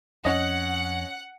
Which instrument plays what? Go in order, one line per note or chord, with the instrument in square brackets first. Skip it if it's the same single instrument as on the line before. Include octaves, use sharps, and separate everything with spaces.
[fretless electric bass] F2 [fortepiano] C#4 D#5 [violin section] F#5